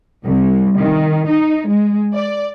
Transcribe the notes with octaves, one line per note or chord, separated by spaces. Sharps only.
C2
D#3
D#4
G#3
D5